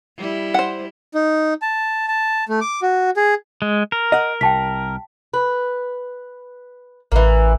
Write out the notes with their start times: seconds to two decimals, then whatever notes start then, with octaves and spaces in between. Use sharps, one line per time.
0.17 G3 E4
0.54 C5 F#5
1.14 D#4
1.62 A5
2.08 A5
2.49 A3
2.61 D6
2.82 F#4
3.17 G#4
3.62 G#3
3.92 A#4
4.12 D#5 F#5
4.41 C2 G5 A5 B6
5.34 B4
7.12 A1 E3 A#3